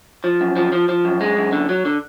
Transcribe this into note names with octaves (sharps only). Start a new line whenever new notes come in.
F3
F#2
F3
F3
F3
F#2
G#3
F#2
D3
F#3
D3